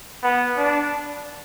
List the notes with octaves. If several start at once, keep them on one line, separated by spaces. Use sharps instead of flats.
B3
D4